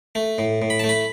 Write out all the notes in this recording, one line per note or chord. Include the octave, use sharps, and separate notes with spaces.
A3
A2
A2
B5
A5
A3
B5